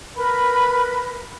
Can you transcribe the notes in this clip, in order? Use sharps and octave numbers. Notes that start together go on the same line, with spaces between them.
A#4 B4 B5